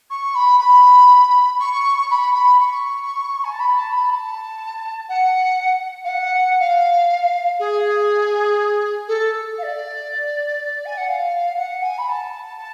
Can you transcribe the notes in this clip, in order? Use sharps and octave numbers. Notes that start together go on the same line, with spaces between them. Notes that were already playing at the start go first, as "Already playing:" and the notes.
C#6
B5
B5
C#6
B5
B5
C#6
G#5
A5
B5
A5
B5
A5
F#5
F5
F#5
F5
G#4
A4
F5
D5
G#5
F#5
F5
F#5
G#5
B5
A5
A5